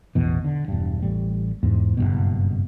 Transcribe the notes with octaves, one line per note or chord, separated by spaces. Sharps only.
A1 E2 B2
D3
E1 G2
A1 G3
E2 G#2
F#1 B1 G2 B2